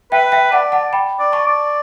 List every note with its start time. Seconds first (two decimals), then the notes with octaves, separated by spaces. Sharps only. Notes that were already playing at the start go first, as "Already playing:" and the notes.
0.12 B4 E5 G5
0.32 E5 G5
0.52 D5 F#5 A5
0.72 F#5 A5
0.93 G5 B5
1.19 D5
1.32 A5 C#6
1.46 D5